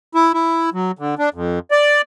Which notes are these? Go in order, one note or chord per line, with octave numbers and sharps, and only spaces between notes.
E4
E4
F#3
D3
D4
F2
D5